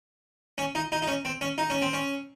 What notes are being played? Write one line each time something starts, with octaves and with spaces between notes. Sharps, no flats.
C#4
D#4
D#4
D#4
C#4
C4
C#4
D#4
C#4
C4
C#4